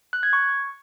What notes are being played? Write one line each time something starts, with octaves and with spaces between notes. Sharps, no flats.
F#6
G#6
C#6